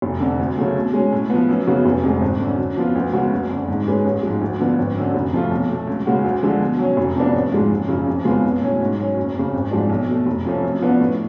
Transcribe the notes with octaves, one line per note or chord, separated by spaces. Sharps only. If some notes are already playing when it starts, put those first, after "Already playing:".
F1
F2 D3
D2
C#3 F#3 A3
B2
G#3 C#4
A2
F3 B3
F#2
C#3 F#3 B3
F1
F2 D3 G#3
G#1
F#2 D3
F#2
F3 B3 F4
D2
C#3 G#3 B3 F#4
F#1
F2 D3
G#2
G#3 C#4 G#4 B4
A1
G#2 F3 G#3
D2
D3 F3 B3
G#1
F#2 D3
F1
F2 F3 A3 F4
B1
B2 A3
C#2
C#3 G#3 C#4 F#4
D2
D3 F3 G#3
B2
F#3 C#4
F1
F2 F3 B3 D4
A1
G#2 F3 G#3
F#1
F#2 C#3 F3
F2
C#3 G#3 B3 F4
B1
A2 F#3 C#4
G#2
F#3 C#4
F#1
F2 C#3
G#1
G#2 F3 G#3 D4
B1
B2 A3
F1
F2 F3 A3 C#4
F#2
F3 B3 D4 F#4
A2